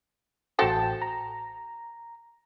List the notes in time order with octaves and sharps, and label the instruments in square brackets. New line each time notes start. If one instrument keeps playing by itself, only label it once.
[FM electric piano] A1 G5 A5 [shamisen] F#4 A4 C5
[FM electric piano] A#5